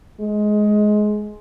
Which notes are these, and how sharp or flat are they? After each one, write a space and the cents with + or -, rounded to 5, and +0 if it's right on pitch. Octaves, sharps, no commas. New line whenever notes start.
G#3 +15